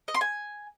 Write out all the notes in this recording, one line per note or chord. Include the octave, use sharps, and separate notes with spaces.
D#5
C6
G#5